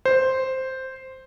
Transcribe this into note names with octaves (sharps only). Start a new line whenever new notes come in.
C5